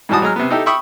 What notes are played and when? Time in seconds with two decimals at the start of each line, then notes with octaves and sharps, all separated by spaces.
0.09 G#2 E3 G3 F#4 A5 D#6
0.22 F#3 G#3 A#5 F6
0.36 C3 B3
0.50 D#4 E4 G4 A4
0.66 E5 G5 B5 C#6 D#6